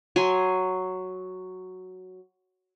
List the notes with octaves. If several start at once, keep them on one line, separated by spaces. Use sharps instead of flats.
F#3 G#5 C6